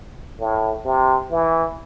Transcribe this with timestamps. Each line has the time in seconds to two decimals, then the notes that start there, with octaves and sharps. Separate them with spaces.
0.39 A2
0.85 C3
1.31 E3